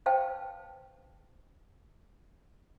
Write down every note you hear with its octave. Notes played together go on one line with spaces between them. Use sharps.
B4 C5 F5 G5 A5